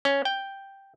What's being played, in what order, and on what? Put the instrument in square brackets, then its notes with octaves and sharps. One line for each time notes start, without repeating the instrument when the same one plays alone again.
[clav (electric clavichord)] C#4
G5